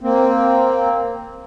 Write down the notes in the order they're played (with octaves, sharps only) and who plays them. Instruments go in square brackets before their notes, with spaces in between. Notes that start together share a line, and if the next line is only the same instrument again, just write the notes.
[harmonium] A#3 C4